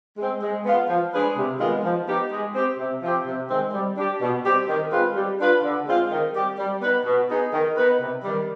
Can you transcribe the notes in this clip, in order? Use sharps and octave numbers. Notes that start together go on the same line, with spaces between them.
G#3 C4
G#3
B3 F4
F3
G#3 D4 G#4 B4
C3
D#3 G#3 B3 F4
F3
B3 D#4 G4
G#3
C4 G4
C3
F3 C4 G4
C3
D#3 G#3 C4
G3
D4 G4
B2
G3 C4 G4
D#3
G#3 C4 F4 B4
G3
D4 F4 B4
D3
G#3 C4 F4
D#3
G3 C4 G4
G3
B3 D#4 B4
B2
B3 D#4 G#4
D#3
B3 D#4 B4
C3
D#3 G3